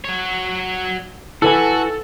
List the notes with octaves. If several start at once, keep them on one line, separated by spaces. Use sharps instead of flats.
F#3 C#5
E4 F#4 A4 B4 G#5